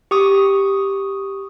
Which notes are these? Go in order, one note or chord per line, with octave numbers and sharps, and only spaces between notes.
G4 C#6 D#6